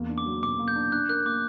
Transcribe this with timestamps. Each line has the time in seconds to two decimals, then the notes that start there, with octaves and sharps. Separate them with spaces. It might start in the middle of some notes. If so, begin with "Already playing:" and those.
Already playing: E2 A#3
0.09 D4
0.18 D6
0.26 F#3
0.42 B2 D6
0.59 A#3
0.68 G6
0.76 D4
0.92 D4 F#6
1.09 A#4 F#6
1.26 A#3 D6